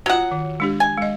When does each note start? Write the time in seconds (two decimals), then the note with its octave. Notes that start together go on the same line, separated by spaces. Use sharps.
0.06 F#3 F4 F#4 F#5
0.31 D#3
0.60 G#3 D4 G4
0.80 G#5
0.98 G#3 D#5